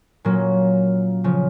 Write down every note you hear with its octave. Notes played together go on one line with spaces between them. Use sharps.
A#2 F#3 A#3 C#4
C#3 F3